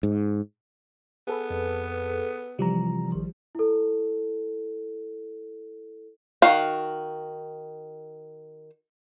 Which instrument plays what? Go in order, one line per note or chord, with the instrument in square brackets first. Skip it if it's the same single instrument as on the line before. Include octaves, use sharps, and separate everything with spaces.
[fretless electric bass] G#2
[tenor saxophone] B3 [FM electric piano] G#4 A4 B4
[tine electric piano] F2
[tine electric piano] C3 E3 A#5 [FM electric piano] F3 G3
[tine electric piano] A1 D#3
[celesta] E4 A4
[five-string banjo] D#3 F#4 F5